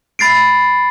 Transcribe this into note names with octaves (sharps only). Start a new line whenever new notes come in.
B5 A6 C7 D7